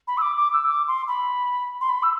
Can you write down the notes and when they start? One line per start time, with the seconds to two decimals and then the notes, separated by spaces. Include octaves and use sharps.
0.08 B5
0.18 E6
0.22 D6
0.37 D6
0.53 E6
0.68 D6
0.88 C6
1.08 B5
1.81 C6
1.89 B5
2.03 E6